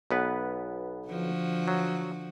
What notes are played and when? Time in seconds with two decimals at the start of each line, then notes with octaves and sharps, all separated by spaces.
0.11 B1 B3 B4
1.08 D3 F3 F#4
1.68 F#3